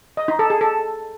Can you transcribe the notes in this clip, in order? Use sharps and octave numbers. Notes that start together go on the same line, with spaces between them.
D#5
D#4
A4
G#4
A4